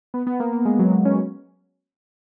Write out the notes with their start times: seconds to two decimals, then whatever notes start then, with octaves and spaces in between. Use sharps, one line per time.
0.14 B3
0.27 B3
0.40 A#3
0.53 A#3
0.65 G#3
0.79 F#3
0.91 G#3
1.05 C#4